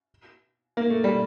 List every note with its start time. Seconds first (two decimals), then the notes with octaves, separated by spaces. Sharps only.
0.77 A#3
0.90 A3
1.04 G3